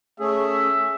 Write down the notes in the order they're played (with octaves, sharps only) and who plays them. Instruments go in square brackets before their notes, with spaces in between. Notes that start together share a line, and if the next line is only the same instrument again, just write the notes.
[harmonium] A3 C#4 G#4 [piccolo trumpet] E5